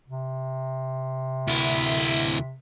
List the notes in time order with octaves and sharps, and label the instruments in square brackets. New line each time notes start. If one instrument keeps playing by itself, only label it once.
[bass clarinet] C3
[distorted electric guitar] D2 E4